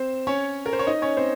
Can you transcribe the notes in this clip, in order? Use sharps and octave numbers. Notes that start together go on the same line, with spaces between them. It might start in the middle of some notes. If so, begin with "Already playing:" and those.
Already playing: C4 C5
C#4 C#5
A#4
C5
C#5
D#4 D#5
C#4 C#5
C4 C5